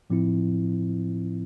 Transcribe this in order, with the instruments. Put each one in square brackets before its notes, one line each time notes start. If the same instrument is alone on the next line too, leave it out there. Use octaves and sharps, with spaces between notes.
[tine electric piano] A2 F3 C4 E4